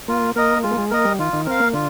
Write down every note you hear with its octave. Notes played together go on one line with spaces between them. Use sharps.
A#3 F4
A#3 A#4 D#5
G#3 F4
A#3
G#3
A#3 A#4 D#5
G3
D#3 F4
D#3
C4 A#4 F5
A#3
D3 F4